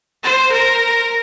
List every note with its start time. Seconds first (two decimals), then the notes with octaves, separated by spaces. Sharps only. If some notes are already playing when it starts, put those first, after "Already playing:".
0.23 C5
0.52 A#4